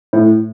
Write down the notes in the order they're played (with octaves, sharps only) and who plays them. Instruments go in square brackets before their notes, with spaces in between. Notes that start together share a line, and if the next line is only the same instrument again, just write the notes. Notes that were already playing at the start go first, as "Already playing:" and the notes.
[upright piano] A2